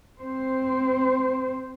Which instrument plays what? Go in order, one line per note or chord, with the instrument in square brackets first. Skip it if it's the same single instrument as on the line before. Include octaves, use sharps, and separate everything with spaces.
[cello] C4 C5